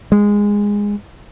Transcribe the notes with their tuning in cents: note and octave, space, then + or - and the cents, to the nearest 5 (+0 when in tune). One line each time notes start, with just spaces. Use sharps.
G#3 -15